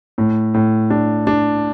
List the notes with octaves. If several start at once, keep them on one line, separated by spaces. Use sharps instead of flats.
A2
A2
D4
D4